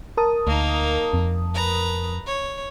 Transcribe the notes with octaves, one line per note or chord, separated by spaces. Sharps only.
A#4 A5 D#6
D2 A#3 D#4
F2
B4 A#5
C#5